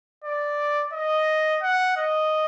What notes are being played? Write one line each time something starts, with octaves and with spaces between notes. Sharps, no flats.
D5
D#5
F#5
D#5